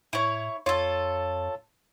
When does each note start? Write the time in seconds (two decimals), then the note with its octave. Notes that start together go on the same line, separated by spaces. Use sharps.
0.13 A2 E4 C#5
0.66 F2 F4 A4 C#5